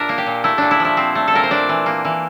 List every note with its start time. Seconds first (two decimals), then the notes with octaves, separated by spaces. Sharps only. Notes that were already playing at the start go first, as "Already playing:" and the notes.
Already playing: A#2 D4 A#4 E5
0.09 A#3
0.18 G4
0.26 A#2
0.44 A3 E4
0.58 A#2 D4
0.71 E4
0.80 F3
0.85 E4
0.97 C4
1.15 A3
1.28 A4
1.33 A#2 A#4
1.43 C5
1.51 D4 D5
1.69 E3
1.86 A#3
2.05 E3